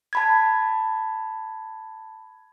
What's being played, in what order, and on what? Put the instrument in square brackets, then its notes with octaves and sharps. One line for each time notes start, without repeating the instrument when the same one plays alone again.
[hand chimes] A5 B5 G#6